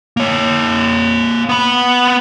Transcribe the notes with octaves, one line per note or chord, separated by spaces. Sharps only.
A#3 C#5
B3 B5